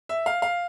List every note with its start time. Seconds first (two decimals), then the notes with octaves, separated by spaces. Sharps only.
0.09 E5
0.26 F5
0.42 F5